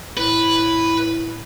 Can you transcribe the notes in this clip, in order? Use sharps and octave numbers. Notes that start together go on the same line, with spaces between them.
A2 B4